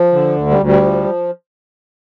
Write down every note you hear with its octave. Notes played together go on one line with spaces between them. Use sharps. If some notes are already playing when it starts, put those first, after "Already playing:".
Already playing: F3
D3
D2
G3
D2
G3
F3